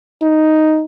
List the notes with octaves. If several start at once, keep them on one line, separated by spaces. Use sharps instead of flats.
D#4